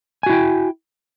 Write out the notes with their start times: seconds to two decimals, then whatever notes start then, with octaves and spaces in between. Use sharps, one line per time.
0.23 G#5
0.26 F#4
0.30 E4
0.33 G5